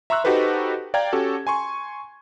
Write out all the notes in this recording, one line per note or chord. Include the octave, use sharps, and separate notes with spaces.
E5 A#5 C6 C#6 E6 F#6
D#4 F#4 G4 A4 B4 C5
D5 F5 G5 A#5 G#6
C#4 F#4 G4 A4
G#5 C6 C#6